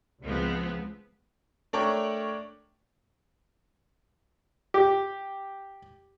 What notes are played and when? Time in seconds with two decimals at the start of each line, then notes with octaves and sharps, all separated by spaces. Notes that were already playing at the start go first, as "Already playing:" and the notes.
0.23 C#2 F3 G#3 B3 C4
1.73 A3 D4 A#4 C#5 D5 G5
4.74 G4